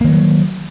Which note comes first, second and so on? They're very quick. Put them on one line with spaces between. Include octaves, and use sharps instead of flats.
A#3 D#3 G#3 F#3